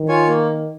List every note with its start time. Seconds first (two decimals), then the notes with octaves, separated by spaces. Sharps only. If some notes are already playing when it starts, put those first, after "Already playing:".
Already playing: D#3
0.08 F4 C#5 G#5
0.28 A#3